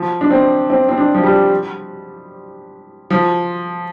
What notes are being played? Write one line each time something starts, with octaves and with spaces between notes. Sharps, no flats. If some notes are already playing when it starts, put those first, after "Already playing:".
Already playing: F3
D4
C4
C4
C4
D4
F3
G3
F3